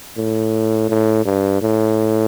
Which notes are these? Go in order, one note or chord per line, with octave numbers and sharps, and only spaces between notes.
A2
A2
G2
A2